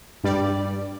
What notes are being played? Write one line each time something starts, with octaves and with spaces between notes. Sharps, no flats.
G2 G3 D5